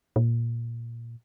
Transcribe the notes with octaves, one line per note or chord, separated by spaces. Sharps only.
A#2